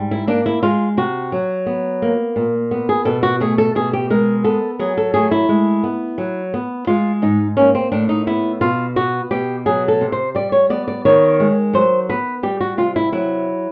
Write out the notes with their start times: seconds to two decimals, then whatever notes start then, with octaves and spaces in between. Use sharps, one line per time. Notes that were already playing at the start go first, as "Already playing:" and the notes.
Already playing: G#2 G3
0.11 E4
0.27 A#3 D4
0.46 E4
0.63 G#3 F4
0.97 C3 F#4
1.32 F#3
1.66 B3
2.02 A#3
2.36 A#2
2.71 B3
2.89 G#4
3.05 B2 A4
3.23 F#4
3.40 A3 G#4
3.58 A4
3.75 B2 G#4
3.93 G4
4.10 G#3 A#4
4.44 B3 A4
4.79 F#3 G#4
4.97 A4
5.14 A3 G#4
5.31 E4
5.49 G#3
5.84 B3
6.18 F#3
6.54 B3
6.87 G#3 F4
7.22 G#2 D#4
7.57 A#3 C#4
7.75 C4
7.92 A2 D4
8.09 D#4
8.27 B3 E4
8.61 B2 F4
8.96 B3 F#4
9.31 B2 G4
9.66 F#3 G#4
9.88 A4
10.01 C3
10.12 C5
10.35 G3 D5
10.52 C#5
10.70 B3 D5
10.88 D5
11.05 D#3 C#5
11.40 G#3
11.73 F#3 C5
12.09 B3 B4
12.43 G3 G4
12.61 F#4
12.78 C3 F4
12.96 E4
13.12 F#3 E4